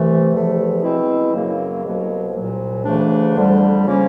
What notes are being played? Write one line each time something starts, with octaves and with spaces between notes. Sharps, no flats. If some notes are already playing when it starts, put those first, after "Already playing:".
Already playing: C2 C3 E3 A3
E2 C3 F3 A3
B2 G#3 C4 E4
F#2 C#3 F#3 A#3
C2 B2 F#3 A#3
C2 A#2 F#3
D2 C#3 E3 A3 D4
F2 D3 G3
C#3 F3 A#3 C#4